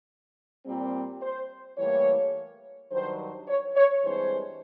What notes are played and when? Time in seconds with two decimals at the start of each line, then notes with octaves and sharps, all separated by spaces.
0.65 A#2 G3 C4
1.21 C5
1.78 A2 E3 G3 A#3 C#5
2.91 G2 D#3 F#3 C5
3.48 C#5
3.76 C#5
4.04 G2 E3 G#3 C4 C5